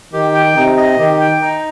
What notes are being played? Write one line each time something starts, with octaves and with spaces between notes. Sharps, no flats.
D#3 G4
G5
C3 D#4
D#5
D#3 G4
G5
D#4